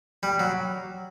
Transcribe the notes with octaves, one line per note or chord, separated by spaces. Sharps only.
G3
F#3